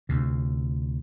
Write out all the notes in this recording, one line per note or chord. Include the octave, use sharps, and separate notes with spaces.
D2 C3